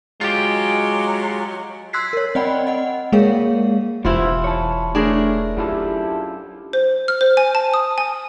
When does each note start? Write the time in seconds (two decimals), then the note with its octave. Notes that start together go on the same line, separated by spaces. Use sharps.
0.21 F#3 G#3 F4 G4
1.93 C6 E6 F#6 G#6 B6 C7
2.13 A#4 C#5
2.35 C4 D5 D#5 F#5 G5 B5
2.67 D#5 F#5
3.12 G#3 A#3 G#4 A#4 C#5 F5
4.05 E1 E3 B3 E4 F4 G4 C5
4.44 C#5 A5
4.95 A3 D4 G#4 A#4
5.57 F#2 F#3 E4 F4 G4 A4
6.73 C5
7.08 F6
7.21 C5
7.37 G#5
7.55 A5
7.74 D#6
7.98 G#5